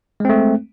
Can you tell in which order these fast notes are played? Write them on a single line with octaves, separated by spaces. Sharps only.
G#3 C4 A3